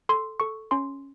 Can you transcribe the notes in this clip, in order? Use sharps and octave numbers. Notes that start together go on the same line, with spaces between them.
A4 C6
A4 C#6
C#4 C6